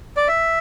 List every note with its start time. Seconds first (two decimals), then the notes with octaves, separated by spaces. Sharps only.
0.17 D5
0.28 E5